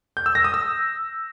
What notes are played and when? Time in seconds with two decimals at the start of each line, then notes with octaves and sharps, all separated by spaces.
0.17 G6
0.26 E6
0.35 A#6
0.44 D#6
0.54 E6